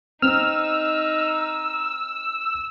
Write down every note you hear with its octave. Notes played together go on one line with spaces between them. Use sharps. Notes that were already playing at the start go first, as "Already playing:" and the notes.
C4 D#4 E6 F6